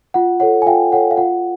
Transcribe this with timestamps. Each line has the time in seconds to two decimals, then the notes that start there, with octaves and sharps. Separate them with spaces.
0.14 F4 F#5
0.40 A4 C#5 F#5
0.62 G#5
0.66 F4 F5 G5
0.92 A4 C#5 F#5
1.11 F5
1.17 F4 F#5